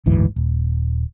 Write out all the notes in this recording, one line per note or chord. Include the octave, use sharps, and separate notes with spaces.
F#1 D2 G#2 E3
D#1